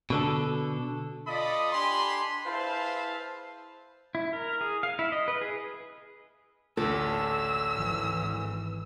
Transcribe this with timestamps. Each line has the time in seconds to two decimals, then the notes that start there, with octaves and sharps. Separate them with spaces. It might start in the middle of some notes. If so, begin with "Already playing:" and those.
0.10 B2 D3 A4
1.27 F4 A4 D5 D#5 B5 D#6
1.73 D4 G4 G#5 B5 C6
2.46 E4 G#4 B4 C5 F5 A5
4.15 E4
4.33 A#4
4.61 G#4
4.83 F5
4.99 E4
5.12 D#5
5.28 B4
5.41 G#4
6.77 A1 D2 A4 E6
7.74 G#1 E3